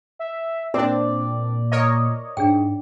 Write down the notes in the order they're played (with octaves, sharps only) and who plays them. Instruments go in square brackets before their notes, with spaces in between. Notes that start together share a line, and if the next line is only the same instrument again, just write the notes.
[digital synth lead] E5
[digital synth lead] A#2 [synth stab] C4 D4 [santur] D5
[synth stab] A#4 C#5 D#5
[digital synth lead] G#2 [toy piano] D4 G#4 G5